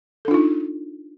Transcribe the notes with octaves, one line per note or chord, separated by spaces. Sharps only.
D4 D#4 F4 A4